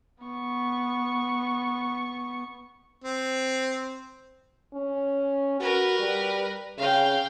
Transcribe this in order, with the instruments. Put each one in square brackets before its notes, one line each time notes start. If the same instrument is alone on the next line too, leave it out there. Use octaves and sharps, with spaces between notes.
[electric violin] B3 C#6
[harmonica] C4
[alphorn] C#4
[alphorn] F#4 [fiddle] A#4 B4
[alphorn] G3
[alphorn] C#3 [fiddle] F5 G5